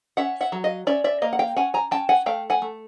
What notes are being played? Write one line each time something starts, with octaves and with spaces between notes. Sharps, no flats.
C#4 E5 F#5
E5 F#5
F#3
D#5 F5
C#4 D5 E5
D5 E5
A#3 D#5 F5
F#5
F5 G5
C#4 F#5 G#5
G#5 A#5
C#4 G5 A5
F#5 G#5
A3 F5 G5
F#5 G#5
A3